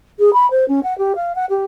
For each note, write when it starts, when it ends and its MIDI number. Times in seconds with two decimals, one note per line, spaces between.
0.19 0.30 68
0.33 0.49 83
0.50 0.67 72
0.68 0.80 61
0.83 0.97 78
0.98 1.13 67
1.15 1.35 77
1.35 1.45 78
1.49 1.65 67